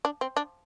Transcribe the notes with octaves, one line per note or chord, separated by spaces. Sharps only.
D4
C4
D4